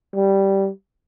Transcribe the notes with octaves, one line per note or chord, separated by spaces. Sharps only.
G3